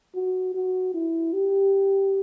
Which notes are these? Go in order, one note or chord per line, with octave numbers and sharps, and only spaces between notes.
F#4
F#4
E4
G4